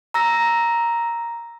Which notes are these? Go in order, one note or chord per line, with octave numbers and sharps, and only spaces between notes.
A#5 E6 A#6